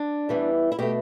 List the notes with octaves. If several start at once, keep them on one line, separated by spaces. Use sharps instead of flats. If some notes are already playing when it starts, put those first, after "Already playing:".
Already playing: D4
E2 E3 G3
E4
B2 A3 G4